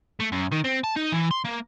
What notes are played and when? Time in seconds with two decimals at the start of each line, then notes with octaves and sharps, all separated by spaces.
0.20 A3
0.32 F#2
0.52 D#3
0.65 C4
0.84 A5
0.96 D#4
1.12 E3
1.31 C6
1.45 A#3